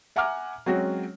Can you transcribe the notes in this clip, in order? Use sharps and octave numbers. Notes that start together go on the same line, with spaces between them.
E5 F#5 G#5 A#5 D6 F6
F#3 G#3 C4 C#4 F#4